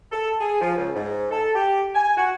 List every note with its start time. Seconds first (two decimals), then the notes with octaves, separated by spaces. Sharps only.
0.12 A4
0.40 G#4
0.61 F3
0.77 C#2
0.95 G#2
1.31 A4
1.55 G4
1.95 G#5
2.17 F#4